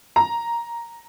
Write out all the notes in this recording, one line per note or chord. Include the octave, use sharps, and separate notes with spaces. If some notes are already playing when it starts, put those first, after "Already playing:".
A#5